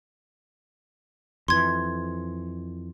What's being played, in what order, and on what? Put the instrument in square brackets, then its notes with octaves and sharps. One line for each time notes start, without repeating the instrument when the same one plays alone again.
[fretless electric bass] F2 E3 [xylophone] C6 G#6